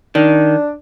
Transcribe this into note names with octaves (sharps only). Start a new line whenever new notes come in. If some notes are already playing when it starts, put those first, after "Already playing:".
D#3 D4